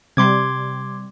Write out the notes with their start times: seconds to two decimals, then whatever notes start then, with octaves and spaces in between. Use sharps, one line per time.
0.17 C3 G3 C6 D6 G#6